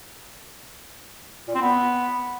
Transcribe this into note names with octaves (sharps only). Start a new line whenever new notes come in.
A#2
C4
B3